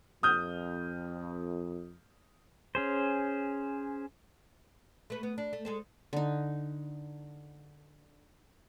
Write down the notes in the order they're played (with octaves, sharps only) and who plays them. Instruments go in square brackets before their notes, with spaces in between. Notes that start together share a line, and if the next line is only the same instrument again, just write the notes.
[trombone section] F2 [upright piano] D#6 F6 G6
[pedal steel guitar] C#4 G#4 C5
[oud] A3 B4
B3
D4
A3
G#3 A4 C5
[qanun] D3 D#4